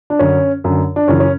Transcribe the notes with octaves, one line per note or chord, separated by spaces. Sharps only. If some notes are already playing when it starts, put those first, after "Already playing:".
D4
F#2 D3 C#4
F#2 D3
D4
F#2 C#3 E3 C#4
C#4